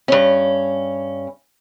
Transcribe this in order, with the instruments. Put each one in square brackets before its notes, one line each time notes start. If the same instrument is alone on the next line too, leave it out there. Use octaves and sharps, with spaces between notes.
[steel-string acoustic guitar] G2 C#4